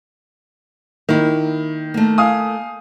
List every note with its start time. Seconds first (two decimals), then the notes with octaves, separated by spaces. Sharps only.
1.09 D#3 A#3 E4
1.94 A3 A#3
2.18 F5 G#5 D#6